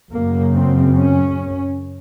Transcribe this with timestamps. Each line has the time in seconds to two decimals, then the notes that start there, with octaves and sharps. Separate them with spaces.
0.11 F#2 C#3 A#3
0.53 C4
0.95 C#4